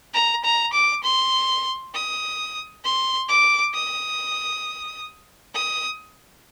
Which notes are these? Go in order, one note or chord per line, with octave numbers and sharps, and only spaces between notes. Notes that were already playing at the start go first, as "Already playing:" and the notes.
A#5
A#5
D6
C6
D#6
C6
D6
D#6
D#6